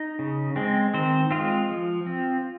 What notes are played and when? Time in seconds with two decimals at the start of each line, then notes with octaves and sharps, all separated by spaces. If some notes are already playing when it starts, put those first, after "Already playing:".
Already playing: D#4 D#5
0.19 C#3
0.56 G#3 C4
0.94 D#3 C4 C5
1.31 G#3 C4 F4
1.69 F3
2.06 C4